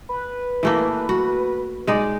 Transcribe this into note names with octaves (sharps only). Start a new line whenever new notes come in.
B4
E3 A3 A#3
F#4
G#3 D#4 D5